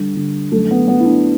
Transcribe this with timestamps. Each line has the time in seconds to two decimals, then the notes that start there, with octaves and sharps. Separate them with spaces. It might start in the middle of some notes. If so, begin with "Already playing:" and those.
Already playing: D3 G3
0.16 D3
0.52 F#2 A3
0.71 B3
0.88 F#3 B3
1.00 E4
1.06 D4